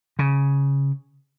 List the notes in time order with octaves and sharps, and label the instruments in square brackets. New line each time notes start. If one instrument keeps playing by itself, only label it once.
[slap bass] C#3